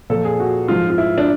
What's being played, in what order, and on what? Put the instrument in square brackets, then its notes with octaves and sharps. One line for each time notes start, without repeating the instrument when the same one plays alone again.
[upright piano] A#2 F3 A4
G#4
F#4
G#2 F3 F4
F4
E4
D4